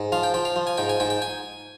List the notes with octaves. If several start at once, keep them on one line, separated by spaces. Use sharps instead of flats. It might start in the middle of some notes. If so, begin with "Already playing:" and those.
Already playing: G#2
F3 F5
G5
F3 G5
F5
F3
G#5
G#2 G5
G#5
G#2 G5
G5
G#5